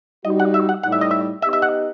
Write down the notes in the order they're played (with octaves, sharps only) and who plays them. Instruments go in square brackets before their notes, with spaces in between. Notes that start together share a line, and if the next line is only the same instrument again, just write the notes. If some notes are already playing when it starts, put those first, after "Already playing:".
[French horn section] G3 D#4 F#4 [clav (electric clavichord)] D#5
[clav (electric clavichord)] F#5
E5
F#5
[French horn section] A2 G3 D#4 [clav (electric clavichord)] F#5
[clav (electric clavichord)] E5
D#5
E5
[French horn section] B3 D#4 G4 D#5 [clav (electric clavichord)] E5
[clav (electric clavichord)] E5
F#5